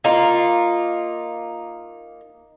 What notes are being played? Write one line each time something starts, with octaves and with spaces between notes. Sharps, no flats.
A#3 D#4 F4